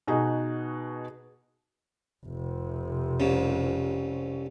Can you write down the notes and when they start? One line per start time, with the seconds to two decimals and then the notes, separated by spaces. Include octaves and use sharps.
0.07 B2 D#4 F#4 G#4
2.26 F1 C3
3.20 C2 C#3